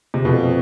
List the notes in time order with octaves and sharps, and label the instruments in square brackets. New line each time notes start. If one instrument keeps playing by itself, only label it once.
[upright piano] C3
[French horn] F2 [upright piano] B2